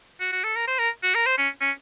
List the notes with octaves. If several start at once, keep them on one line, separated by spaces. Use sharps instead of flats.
F#4
F#4
A4
A#4
C5
A#4
F#4
A#4
C5
C#4
C#4